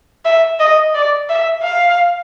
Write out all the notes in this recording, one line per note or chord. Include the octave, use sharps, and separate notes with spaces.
E5
D#5
D5
E5
F5